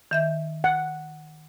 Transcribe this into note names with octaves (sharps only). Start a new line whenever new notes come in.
D#3 E5 G6
F#5